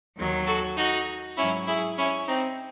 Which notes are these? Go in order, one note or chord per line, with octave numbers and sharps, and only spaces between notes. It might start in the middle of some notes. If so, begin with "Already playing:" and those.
D#2 D#3 F#3
F#4 A4
D#4 F#4
G#2 F#3 C#4 E4
E4 G#4
C#4 E4
C4 D#4